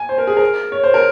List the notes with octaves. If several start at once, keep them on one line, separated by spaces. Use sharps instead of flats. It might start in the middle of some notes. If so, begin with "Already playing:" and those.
Already playing: G#5
C5
A#4
G#4
A#4
C#5
C5
A#4